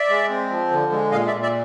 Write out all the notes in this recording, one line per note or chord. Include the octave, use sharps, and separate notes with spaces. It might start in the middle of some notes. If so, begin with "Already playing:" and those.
Already playing: D5 E5
G#3
C4
F3
D3
G#3
A#2 D#5 F5
D5 E5
A#2
D5 E5